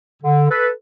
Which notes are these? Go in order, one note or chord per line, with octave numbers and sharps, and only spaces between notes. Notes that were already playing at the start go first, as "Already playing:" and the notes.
D3
A4 B4